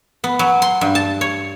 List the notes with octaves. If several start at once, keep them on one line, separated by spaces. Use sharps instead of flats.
B3
F#3
C6
G2
A5
C#5